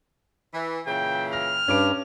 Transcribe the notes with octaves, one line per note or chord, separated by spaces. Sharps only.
E3
A#2 C#3 E3 G5
F6 A#6
G2 C#4 D6 D7